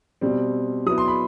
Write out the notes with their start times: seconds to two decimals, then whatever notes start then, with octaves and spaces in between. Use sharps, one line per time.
0.21 B2 G3 C4
0.86 F#3 B3 E4 D#6
0.98 C6
1.08 B5